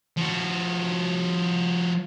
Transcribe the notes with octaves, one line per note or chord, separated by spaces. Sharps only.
F3 F#4